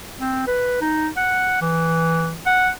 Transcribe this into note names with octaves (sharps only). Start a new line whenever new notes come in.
C4
B4
D#4
F#5
E3
F#5